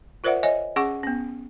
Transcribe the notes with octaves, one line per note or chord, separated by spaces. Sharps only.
F4 A#4 C5 D5 E5 F#5
C#5 D#5 E5 G#5
C#4 G#4 F#5 C#6 D6
B3 C#4